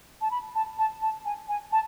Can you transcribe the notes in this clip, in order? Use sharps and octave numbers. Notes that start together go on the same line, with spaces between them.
A5
B5
A5
A5
A5
G#5
G#5
A5